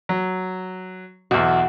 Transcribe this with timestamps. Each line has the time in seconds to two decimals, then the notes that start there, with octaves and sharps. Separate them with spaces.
0.09 F#3
1.31 B1 E2 F#4